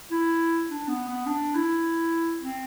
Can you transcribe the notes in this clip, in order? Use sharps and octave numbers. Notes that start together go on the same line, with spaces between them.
E4
D4
B3
B3
D4
E4
C4